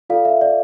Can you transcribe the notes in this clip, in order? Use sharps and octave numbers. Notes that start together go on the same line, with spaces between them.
F4 A4 D5 F5
E5
D5